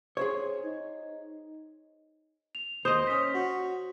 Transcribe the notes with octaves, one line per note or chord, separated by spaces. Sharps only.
G#4 C5 C#5
D#4
F7
D#2 C5 D#5 D#6
C#4 B6
F#4